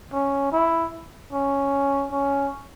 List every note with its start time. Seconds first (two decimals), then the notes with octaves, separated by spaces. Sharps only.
0.13 C#4
0.52 E4
1.33 C#4
2.11 C#4